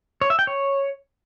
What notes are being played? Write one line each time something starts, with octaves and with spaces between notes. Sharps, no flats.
C#5
E5
G5
C#5